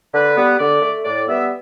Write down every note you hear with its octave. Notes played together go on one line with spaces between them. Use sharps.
D3 B4
G3 B3
D3 D5
A3
A2 D5
G3 B3 E5